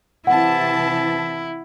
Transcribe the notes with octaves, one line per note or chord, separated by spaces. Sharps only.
C3 E3 E4 F#5 A5